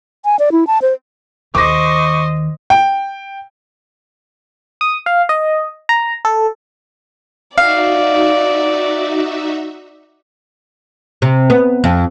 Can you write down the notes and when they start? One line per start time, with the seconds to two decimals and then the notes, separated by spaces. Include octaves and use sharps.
0.25 G#5
0.39 D5
0.52 E4
0.67 A5
0.82 C5
1.55 D#2 D#3 C5 D#5 C#6 D6 A#6
2.70 G5
4.81 D#6
5.06 F5
5.29 D#5
5.89 A#5
6.25 A4
7.58 D#4 F#4 D5 E5 F5
11.22 C3
11.50 B3
11.84 F2